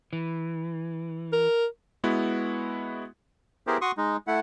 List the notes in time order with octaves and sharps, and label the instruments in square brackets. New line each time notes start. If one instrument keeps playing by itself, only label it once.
[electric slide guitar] E3
[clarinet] A#4
[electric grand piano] G#3 B3 E4 F#4
[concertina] B3 E4 G4 G#4 A#4 C5
F#4 C6 C#6 D#6
G#3 D#4
A3 E4 F#5